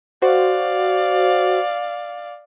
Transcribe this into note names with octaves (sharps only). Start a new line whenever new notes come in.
F#4 C5 D5 F5